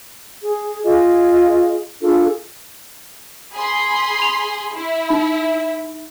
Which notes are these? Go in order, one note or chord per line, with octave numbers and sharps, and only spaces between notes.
G#4
F4 G#4 D#5
D4 F4 G#4 A4
G#4 B5 C6
F7
E4
D#4 B5